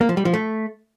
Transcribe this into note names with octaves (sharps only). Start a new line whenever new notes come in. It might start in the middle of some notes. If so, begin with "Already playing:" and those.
A#3
F3
G3
F3
A3